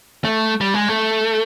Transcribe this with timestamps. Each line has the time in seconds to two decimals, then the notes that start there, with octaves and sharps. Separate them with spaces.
0.25 A3
0.61 G3
0.74 G#3
0.88 A3